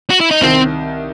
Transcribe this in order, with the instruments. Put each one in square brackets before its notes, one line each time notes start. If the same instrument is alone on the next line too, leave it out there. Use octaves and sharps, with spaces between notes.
[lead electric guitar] F#4
E4
D#4
[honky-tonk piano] C2 C3 D#3 [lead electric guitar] C4